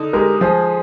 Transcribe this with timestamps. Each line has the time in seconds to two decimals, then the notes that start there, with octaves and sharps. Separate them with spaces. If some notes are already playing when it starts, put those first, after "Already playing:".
Already playing: D3 D#4
0.13 G#3 G4 A#4
0.41 F3 G#4 C5